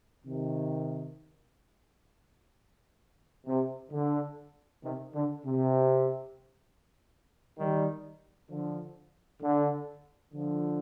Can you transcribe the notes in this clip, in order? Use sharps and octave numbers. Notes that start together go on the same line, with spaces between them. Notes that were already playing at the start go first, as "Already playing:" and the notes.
C3 D#3
C3
D3
C3 D#3
D3
C3
D#3 G3
D3 F3
D3
D3 F3